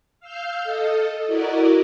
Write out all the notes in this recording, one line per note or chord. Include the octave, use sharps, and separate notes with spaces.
F5 E6 F6 G6
A4 D#5
E4 F#4 A#4 D5 D#5